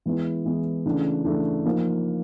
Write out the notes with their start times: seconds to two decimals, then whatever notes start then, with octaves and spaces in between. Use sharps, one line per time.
0.06 E3 G#3 B3 E4
0.45 E3 G#3 B3 E4
0.86 C#3 E3 A3 D4
1.25 C#3 E3 A3 D4
1.65 F3 A#3 D#4